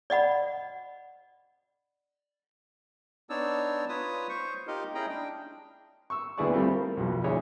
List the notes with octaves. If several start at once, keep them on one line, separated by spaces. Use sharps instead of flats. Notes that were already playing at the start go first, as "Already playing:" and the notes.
D5 D#5 F#5 B5
B3 D4 D#4 C#5 D5 E6
F4 B4 C#5 D#6
C5 C#6
D#4 F4 G4 A#4 D#5
C#4 E4 G#4 D#5 G5 A#5
D4 G5
C#6 E6
D2 B3 E4 G#4 D5 C#6
G3 A3 C4 E4 F4
A#4
B1 F2 B2
D2 E4 G#4 C#5